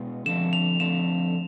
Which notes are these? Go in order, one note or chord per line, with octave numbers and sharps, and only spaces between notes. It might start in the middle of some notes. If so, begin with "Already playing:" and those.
Already playing: B2 G#3 B3
D3 F3 A3 C4 E7
F7
D3 F3 A3 C4 E7